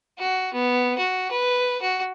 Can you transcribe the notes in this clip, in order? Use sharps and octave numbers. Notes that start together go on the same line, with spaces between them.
F#4
B3
F#4
B4
F#4